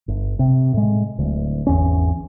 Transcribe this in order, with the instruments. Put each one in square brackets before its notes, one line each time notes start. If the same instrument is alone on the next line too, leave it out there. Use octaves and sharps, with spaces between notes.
[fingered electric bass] G1
C3
A2 G#3
D1 D2
G#1 E2 C#4